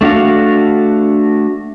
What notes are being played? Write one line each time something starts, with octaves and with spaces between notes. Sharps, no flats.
A3 D4 F#4 F5